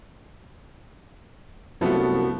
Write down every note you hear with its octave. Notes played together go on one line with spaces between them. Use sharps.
C2 F#2 F3 A3 B3 F#4